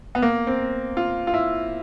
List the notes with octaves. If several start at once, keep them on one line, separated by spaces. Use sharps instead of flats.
B3
A#3
C4
F4
F4
E4